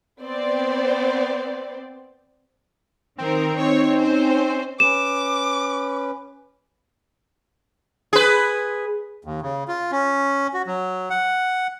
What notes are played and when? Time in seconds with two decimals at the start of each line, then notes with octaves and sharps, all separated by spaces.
0.22 B3 C4 C5 D5
3.18 D#3 C4 A#4
3.59 D#4 C#5
3.98 C#4 C5
4.80 C#4 B4 D6 E7
8.13 G#4 B4
9.25 D#2
9.42 C#3
9.68 F4
9.91 C#4
10.54 F#4
10.67 F#3
11.10 F#5